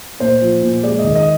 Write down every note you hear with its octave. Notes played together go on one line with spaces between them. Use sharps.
A#2 C5
F3
A#2
G#3 D5
D#5
D#3
D#5